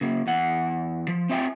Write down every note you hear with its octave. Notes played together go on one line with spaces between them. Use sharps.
C#3 A#3
E2 F#5
F3
C4 F4 E5 F5 G5 G#5